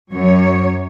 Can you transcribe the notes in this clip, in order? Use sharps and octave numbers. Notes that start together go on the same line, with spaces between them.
F#2 C#5